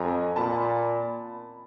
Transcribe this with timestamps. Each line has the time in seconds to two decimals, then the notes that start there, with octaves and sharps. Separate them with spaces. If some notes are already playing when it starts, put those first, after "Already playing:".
Already playing: F2 G#5 A#5
0.36 A#2 A5 B5